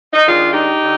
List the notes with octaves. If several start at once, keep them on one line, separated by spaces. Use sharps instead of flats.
D#4
D#3 G#3 D4 F4
D#4 G4
D3